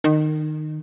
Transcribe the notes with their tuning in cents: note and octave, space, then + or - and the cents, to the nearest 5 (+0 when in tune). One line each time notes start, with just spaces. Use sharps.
D#3 -20